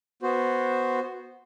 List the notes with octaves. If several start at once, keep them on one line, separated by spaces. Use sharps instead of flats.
B3 F#4 C5